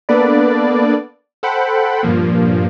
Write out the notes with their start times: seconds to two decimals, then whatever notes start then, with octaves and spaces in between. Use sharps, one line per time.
0.09 A#3 B3 D4 A4 B4 D5
1.43 A4 C5 F#5 G5 B5
2.03 G2 A#2 F3 A#3